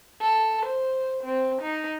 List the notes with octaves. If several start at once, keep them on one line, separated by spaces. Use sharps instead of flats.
A4
C5
C4
D#4